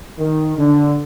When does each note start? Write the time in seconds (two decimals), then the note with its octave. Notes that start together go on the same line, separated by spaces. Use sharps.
0.19 D#3
0.57 D3